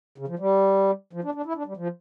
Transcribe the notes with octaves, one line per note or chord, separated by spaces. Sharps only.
C#3
F3
G3
F3
D4
D4
E4
D4
G3
F3